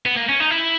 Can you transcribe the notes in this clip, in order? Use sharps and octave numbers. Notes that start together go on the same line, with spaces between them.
B3
A#3
C#4
D#4
E4